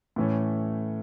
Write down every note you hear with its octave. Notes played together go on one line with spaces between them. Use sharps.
A2 E3 A3 C#4